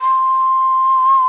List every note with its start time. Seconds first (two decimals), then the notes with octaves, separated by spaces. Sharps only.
0.01 C6